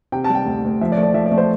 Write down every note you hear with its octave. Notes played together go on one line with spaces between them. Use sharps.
C3 G5
A5
G3
G5
D2
D2
F3 E5
D5
A3
D5
F3 E5
D5
A3
C5